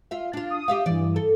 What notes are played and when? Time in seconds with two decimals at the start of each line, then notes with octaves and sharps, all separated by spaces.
0.11 F4 E5
0.33 D4 F4
0.50 D#6
0.68 G4 E5 F5
0.86 G2 E3 D5
1.16 A4